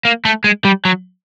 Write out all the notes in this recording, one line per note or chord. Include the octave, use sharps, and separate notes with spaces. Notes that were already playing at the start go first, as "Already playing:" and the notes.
A#3
A3
G#3
G3
F#3